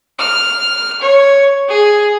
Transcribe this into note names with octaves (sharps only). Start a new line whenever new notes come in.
F6
C#5
G#4